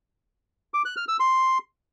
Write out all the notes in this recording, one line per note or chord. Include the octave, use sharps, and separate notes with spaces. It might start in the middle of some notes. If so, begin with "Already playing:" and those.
D6
F#6
F6
E6
C6